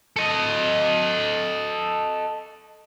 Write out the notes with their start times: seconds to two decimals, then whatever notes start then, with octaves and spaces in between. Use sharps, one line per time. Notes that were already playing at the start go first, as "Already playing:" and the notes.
0.17 A4 D#5